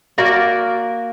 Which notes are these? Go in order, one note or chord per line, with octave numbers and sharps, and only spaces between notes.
A#3 F#4 A#4 D5